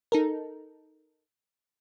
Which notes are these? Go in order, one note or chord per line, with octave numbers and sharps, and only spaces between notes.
D#4 A4 A#4